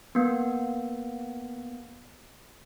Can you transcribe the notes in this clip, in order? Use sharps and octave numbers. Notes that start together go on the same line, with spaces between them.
A#3 B3